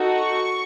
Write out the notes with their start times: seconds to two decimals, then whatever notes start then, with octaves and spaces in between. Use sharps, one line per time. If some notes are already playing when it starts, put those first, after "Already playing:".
Already playing: D#4 F#4 A4
0.16 C#6